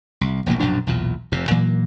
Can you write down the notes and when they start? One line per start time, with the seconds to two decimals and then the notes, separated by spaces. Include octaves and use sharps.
0.21 C2
0.46 E1 A#1 F2 A#3
0.60 A#1 F#2 B2 D4
0.87 B1 E2 A#2
1.32 F1 F2 C3
1.51 A#2 E3 F#3 A#3